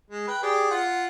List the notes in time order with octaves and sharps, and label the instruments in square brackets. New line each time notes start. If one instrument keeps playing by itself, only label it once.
[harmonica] G#3
B4 G5
G4 G#4 D5
F4 F#5